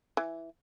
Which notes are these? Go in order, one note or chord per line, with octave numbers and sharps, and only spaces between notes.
E3